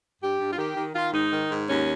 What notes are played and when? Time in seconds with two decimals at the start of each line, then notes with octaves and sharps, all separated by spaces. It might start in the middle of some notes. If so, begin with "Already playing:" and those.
0.21 G2 G4
0.39 G2
0.51 F4
0.57 D#3 G4
0.76 D#3
0.94 D#3 F4
1.12 G#2 D#4
1.32 D#3
1.50 G#2
1.67 D#2 C#4